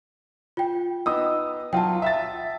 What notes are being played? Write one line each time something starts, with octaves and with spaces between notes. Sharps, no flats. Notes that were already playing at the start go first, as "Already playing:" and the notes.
F4 G5
B3 D#4 D#6 E6
F#3 F4 G5 A5
E5 E6 A6